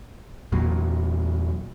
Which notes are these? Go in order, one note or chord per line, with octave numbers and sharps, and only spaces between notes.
E2 A#2 F#3